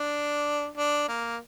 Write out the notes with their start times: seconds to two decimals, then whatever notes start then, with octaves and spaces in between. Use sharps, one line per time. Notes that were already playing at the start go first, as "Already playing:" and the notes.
Already playing: D4
0.77 D4
1.08 A#3